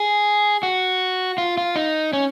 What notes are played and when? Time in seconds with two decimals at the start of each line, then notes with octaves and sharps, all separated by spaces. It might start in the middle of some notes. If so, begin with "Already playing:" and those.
Already playing: G#4
0.63 F#4
1.38 F4
1.58 F4
1.76 D#4
2.13 C#4